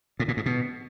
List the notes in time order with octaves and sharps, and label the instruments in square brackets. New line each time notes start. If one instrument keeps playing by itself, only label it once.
[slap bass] A2
A#2
G#2
B2